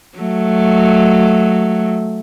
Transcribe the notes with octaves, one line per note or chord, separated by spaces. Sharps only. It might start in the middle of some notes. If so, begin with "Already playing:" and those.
F#3 A3